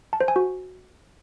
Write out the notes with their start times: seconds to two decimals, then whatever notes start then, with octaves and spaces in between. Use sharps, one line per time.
0.13 A5
0.21 C5
0.28 G#5
0.36 F#4